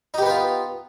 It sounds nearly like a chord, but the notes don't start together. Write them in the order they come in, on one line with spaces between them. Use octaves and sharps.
D#4 G4 B3 B4 F4